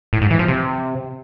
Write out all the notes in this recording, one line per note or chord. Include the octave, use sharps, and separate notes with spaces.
A2
G#2
E3
F3
C3